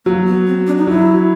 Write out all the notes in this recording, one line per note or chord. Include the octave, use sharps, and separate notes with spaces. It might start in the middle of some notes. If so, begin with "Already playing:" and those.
F#3 A#3
B3
C4
D4
D#4
F#3 E4